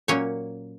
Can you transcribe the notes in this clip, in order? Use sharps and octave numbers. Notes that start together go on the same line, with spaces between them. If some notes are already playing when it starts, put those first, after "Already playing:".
A#2 F#3 A#3 C#4 C#5